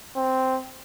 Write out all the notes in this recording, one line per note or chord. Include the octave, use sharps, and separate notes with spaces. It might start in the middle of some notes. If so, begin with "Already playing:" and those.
C4